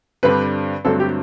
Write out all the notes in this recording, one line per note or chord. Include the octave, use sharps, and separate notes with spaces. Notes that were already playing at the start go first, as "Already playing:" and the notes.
G2 D3 G3 C4 B4
G2 D3 F#3 A3 C4 A4
G4